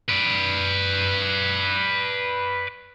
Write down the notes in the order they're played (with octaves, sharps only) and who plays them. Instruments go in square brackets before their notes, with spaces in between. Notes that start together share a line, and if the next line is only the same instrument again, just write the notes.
[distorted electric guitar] B4 D5